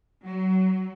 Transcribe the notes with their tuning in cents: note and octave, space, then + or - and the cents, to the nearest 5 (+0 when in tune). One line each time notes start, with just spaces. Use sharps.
F#3 +25